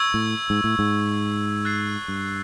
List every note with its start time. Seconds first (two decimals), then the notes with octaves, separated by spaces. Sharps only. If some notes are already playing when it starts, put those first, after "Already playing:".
Already playing: C#6 E6 G#6
0.14 A2
0.50 G#2
0.64 A2
0.79 G#2
1.65 F#6 A6 C7
2.08 G2